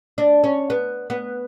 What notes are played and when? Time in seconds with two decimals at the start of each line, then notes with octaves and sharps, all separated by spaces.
0.18 D4
0.44 C#4
0.70 B3
1.10 B3